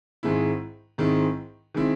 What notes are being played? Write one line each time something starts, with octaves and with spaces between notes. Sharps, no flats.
G#2 D#3 G#3 C4 E4
G#2 D#3 G#3 C4 E4
D#3 G#3 C4 E4